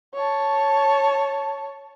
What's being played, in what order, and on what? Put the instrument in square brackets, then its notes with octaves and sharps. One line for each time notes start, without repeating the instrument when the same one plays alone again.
[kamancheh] C#5 A5